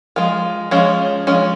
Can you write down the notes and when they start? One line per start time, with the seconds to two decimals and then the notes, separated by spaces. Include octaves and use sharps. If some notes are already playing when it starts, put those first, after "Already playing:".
0.16 F3 G#3
0.71 F3 G#3 C#4
1.27 F3 G#3 C#4